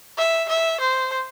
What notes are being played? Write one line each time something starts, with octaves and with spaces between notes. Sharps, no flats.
E5
E5
C5